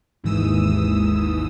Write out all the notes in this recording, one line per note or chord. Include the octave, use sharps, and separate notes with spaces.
G#1 D#2 G#2 E3 D#6 E6